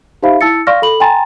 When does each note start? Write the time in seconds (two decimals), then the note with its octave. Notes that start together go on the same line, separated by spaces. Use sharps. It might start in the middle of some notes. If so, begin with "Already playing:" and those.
0.23 D#4 G4 C5 E5 F5 B5
0.41 E4 A5 E6 A6 C#7
0.67 D5 F5 C6 C#6 F6 A#6
0.82 A4 B5 F#7
1.00 G5 G#5 A#5 C6 A6